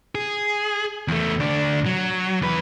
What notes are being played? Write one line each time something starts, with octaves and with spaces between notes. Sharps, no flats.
G#4
E2 A3
D2 D4
F#3
E2 B4